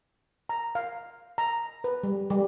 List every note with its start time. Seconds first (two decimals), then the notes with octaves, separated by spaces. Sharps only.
0.49 A#5
0.75 F5
1.38 A#5
1.84 B4
2.03 G3
2.30 G3